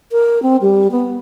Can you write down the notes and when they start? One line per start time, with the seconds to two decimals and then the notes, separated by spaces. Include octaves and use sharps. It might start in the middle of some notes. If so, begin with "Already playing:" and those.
0.12 A#4
0.42 C4
0.61 G3
0.91 B3